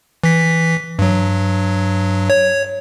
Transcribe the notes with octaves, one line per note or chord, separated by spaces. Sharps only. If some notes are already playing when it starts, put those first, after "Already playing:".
E3 B6
G2 F#3
C#5